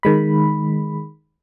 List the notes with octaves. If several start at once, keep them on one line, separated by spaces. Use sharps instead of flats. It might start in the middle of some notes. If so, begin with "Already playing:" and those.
D#3 G#3 B5